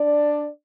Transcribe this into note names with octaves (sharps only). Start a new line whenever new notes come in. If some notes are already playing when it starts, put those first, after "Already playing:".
Already playing: D4 D5